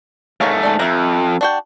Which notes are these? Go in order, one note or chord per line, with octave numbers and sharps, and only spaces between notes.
G#2 A3 A#4 C#5 F5
A4 D5
F2 E5 A#5
D4 F#4 G5